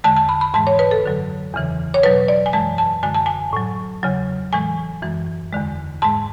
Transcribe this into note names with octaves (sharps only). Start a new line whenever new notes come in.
E2 D3 G#3 A5
A5
B5
B5
G#2 E3 G#3 A5
C#5
B4
A4
F#2 D3 F#3
E2 C#3 E3
C#5
B2 F#3 B4
D5
G#5
F#2 E3 G#3 A5
A5
F#2 D3 G#3 G#5
A5
G#5
A2 F#3
E2 C#3 F#3
A2 E3 G#3 G#5
F#2 E3 G#3
E2 D3 G#3
G#2 G#3 A5